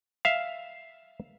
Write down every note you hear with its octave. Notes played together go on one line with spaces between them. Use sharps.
E5 F5